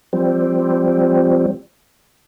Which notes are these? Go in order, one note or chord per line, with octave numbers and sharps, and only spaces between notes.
F3 G3 C4